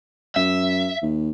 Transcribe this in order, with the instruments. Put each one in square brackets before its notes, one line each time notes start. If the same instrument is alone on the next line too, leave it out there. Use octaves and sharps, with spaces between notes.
[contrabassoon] F#2 [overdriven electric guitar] E5
[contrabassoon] D#2